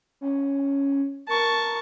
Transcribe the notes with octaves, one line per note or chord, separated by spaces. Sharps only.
C#4
A#4 A5 C#6